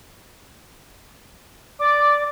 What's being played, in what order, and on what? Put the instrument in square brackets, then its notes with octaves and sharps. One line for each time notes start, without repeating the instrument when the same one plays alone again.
[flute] D5 [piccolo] D6